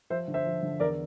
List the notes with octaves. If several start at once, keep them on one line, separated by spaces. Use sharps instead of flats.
F3 C5 E5
D3
C5 E5
F3
D3
E2 A#4 D5